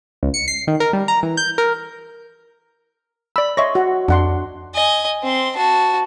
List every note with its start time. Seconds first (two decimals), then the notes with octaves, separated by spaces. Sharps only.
0.23 C#2
0.34 C#7
0.48 C7
0.68 D#3
0.80 A#4
0.93 G3
1.08 A#5
1.23 E3
1.37 G6
1.58 A#4
3.36 D5 B5 E6
3.57 C#5 D#5 E5 C6 C#6 A#6
3.75 F#4
4.08 F2 D4 F#5 C6
4.75 D#5 G#5
5.23 C4 C6
5.56 F#4 A5